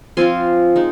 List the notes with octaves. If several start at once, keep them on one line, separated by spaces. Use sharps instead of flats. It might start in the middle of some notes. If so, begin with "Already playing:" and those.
F3 C4 F4 G#5 C6
G#3 D#4